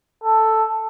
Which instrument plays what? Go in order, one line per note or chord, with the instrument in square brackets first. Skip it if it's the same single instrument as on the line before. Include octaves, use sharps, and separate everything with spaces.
[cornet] A4